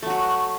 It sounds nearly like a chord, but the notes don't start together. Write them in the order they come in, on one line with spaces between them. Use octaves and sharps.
A3 F#3 F#4